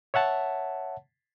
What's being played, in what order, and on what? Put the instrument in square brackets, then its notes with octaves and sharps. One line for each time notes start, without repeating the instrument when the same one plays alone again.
[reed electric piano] C#5 E5 F#5 A5